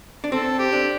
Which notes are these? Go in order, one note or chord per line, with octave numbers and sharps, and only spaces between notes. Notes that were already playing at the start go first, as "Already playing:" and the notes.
D4
C4 A4
G4
D4